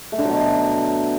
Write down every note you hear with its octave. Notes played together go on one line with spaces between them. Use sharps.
A3
D3
F#3
B2